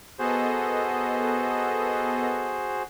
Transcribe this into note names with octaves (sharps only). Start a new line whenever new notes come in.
B3 F#4 G#4 A4 C5 D#5